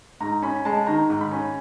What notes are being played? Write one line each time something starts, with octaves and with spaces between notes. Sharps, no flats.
G#2 A#5
C#4 B5
G#3 A5
D#3 A#5
G#2
B5
C#4